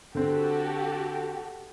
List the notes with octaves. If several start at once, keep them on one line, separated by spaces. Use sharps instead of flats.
D3 C4 F#4 G4 A4